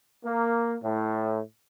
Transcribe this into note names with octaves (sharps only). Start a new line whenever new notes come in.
A#3
A2